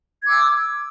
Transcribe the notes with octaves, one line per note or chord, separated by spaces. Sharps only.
D6 E6 G#6